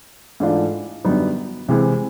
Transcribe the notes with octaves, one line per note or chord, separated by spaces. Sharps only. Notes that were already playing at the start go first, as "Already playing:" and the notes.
G#2 E3 A3 D4 F4
F#2 D3 G3 B3 D#4
C3 E3 G#3 C4